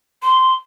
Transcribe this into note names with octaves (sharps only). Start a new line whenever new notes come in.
C6